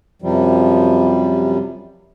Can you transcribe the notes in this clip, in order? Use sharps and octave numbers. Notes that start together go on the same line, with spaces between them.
F#2 C3 F3 G3